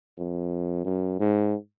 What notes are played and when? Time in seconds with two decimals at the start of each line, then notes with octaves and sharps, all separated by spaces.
0.18 F2
0.85 F#2
1.19 G#2